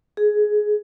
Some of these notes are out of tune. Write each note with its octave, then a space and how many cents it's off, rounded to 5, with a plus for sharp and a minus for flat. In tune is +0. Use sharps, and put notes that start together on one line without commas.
G#4 +15